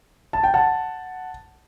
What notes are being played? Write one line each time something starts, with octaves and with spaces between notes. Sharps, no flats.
A5
G5
F#5 A5